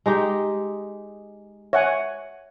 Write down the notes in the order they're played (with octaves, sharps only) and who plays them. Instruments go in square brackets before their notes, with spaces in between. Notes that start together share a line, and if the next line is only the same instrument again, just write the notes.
[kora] G#3 D#4 G4
[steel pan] C#5 F#5 G#5 [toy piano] E5